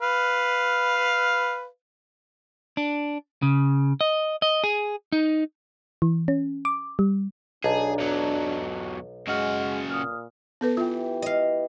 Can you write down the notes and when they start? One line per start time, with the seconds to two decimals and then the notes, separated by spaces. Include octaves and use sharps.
0.01 B4 F5
2.77 D4
3.42 C#3
4.01 D#5
4.42 D#5
4.64 G#4
5.12 D#4
6.02 E3
6.28 C#4
6.65 D6
6.99 G3
7.64 B1 D4 G#4 D#5 A5 A#5
8.00 E2 F#3
9.28 C#3 G#3 F#4 D#5 F6
9.90 A#2 D#6 F6
10.61 B3 A4 B4
10.77 E3 F4 G4
11.22 D#5 F5